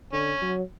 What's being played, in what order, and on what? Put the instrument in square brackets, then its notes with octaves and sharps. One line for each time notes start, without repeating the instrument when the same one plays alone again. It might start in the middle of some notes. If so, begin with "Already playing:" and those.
[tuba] D3 [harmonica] C#4
[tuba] F#3